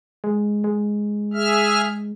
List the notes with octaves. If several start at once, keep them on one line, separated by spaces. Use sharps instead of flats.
G#3
G#3
G#4 E5 F6